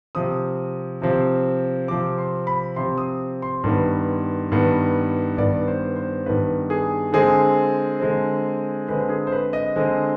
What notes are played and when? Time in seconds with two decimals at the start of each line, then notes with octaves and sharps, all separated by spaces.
0.15 C3 F3 C4 D#6
1.02 C3 F3 C4
1.88 C3 F3 C4 D6
2.18 C6
2.47 B5
2.76 C3 F3 C4 C6
2.98 D#6
3.42 C6
3.64 G2 D#3 B3
4.52 G2 D#3 B3
5.38 G2 D#3 B3 D5
5.68 C5
5.96 C5
6.26 G2 D#3 B3 B4
6.70 G#4
7.13 D3 G#3 C4 G#4
8.00 D3 G#3 C4
8.88 D3 G#3 C4 B4
9.09 G#4
9.27 C5
9.32 B4
9.53 D#5
9.76 D3 G#3 C4